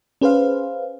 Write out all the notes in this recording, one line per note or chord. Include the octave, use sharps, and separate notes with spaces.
C#4 G#4 B4 C5 F5